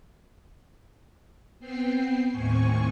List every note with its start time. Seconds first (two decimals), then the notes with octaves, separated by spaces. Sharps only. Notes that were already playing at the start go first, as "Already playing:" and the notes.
1.59 B3 C4 G5 C7
2.31 D#2 A2 C4 G#5 C#6